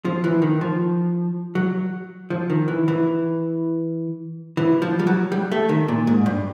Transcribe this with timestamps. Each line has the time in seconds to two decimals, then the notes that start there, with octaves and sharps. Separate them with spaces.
0.05 F3
0.24 E3
0.42 D#3
0.61 F3
1.55 F#3
2.30 F3
2.50 D#3
2.68 E3
2.88 E3
4.57 E3
4.82 F3
4.99 G3
5.07 F#3
5.32 G3
5.52 A3
5.69 D#3
5.88 A#2
6.07 G#2
6.26 G2